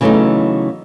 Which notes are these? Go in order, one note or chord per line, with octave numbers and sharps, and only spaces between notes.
C#3 E3 F#3 A3 B3 D#4